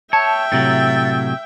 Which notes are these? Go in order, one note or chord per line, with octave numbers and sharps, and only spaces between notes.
C#5 E5 G5 A5
A2 C3 F#3 A6